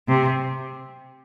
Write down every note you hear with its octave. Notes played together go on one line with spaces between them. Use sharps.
C3